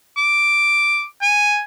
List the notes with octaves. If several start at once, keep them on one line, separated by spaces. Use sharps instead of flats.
D6
G#5